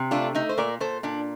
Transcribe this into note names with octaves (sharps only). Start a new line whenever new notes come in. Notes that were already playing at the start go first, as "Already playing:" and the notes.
Already playing: C3
A3 D4 F4
A3 D#4
C5
A#2 A#4 D5
A#2 A4 C5
A#2 D4